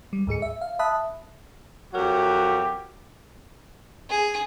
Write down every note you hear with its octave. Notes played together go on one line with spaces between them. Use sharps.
G3
D2 G#2 G#4 C#7
E5
F5
E5 A5 B5 D#6 F#6
F2 F#3 F#4 G4 A#4
G#4